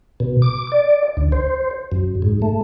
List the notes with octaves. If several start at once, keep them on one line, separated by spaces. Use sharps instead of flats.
B2
D6
D5
D2
C5
F#2
G#2
A3